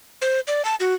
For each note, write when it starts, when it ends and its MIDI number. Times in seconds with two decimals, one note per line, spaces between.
0.22 0.40 72
0.47 0.64 74
0.65 0.75 81
0.80 0.94 66